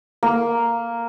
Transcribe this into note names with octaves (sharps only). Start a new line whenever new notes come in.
A#3